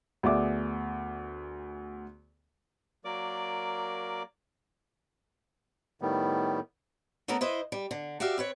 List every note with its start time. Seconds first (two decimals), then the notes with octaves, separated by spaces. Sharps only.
0.23 D2 B3 G#4 D5 E5 D6
3.05 F#3 A#3 A#4 D5 D6
6.02 A2 D#3 G3 B3
7.28 A3 B3 C#4 A4 A#4
7.41 E4 B4 C5 D#5
7.72 G3
7.91 D3
8.20 F#4 G4 D5 E5 F5
8.38 C4 B4 C#5